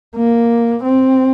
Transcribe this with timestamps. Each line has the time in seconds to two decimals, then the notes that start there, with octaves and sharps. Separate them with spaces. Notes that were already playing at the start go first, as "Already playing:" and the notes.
0.16 A#3
0.84 C4